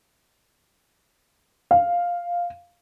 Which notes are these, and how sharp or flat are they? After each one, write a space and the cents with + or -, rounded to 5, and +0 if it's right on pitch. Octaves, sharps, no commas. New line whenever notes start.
F5 +0